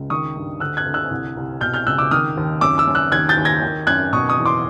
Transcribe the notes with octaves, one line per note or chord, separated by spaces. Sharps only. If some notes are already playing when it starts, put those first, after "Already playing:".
Already playing: C#2
D#3 C#6 D#6
G2
D2 E6 F#6
F#6 G#6
D2
E6 F#6
C2
C2
B2 F6 G6
F6 G6
C#2 E6 F#6
D6 E6
D#3 D#6 F6
D#2
F#2 D6 E6
D6 E6
F#2
E6 F#6
D#2 F#6 G#6
G6 A6
D#2
G#6 A#6
D#3
F#2 F#6 G#6
B2 C#6 D#6
C#6 D#6
E2
C6 D6